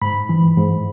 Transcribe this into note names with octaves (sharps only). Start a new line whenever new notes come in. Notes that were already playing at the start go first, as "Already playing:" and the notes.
G#2 B5
E3
G#2